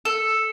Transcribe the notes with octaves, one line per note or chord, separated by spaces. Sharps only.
A4